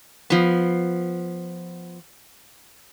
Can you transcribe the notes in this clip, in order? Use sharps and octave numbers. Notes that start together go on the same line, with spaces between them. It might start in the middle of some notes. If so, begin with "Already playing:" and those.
F3 B3